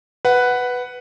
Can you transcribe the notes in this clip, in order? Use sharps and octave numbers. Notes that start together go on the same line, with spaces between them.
B4 F#5